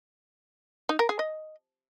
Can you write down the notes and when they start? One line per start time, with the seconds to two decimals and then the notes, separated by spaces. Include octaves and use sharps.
0.89 D#4
0.99 A#4
1.09 G#4
1.19 D#5